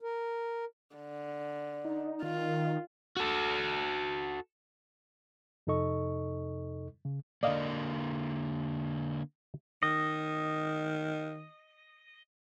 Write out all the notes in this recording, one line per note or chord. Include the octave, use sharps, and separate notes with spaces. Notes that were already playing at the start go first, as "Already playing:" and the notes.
A#4
D3
D#4
D#3 F4
F#4 A4
F2 C3 D#4 A4 D#5 C#6
C#3
D3 A#3 D5 D#5 F5
D#3 D#5